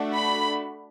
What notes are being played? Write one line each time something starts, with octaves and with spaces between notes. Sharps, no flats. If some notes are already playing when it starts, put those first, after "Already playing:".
Already playing: A3 D4 F#4 A4
B5